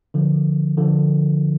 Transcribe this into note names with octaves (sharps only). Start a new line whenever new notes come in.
D3 F3
D3 F3